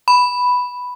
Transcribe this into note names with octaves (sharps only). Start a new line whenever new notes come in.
B5